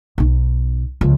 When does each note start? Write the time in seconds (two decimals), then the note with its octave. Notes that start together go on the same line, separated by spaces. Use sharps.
0.18 B1 D#4
1.01 C#2 F3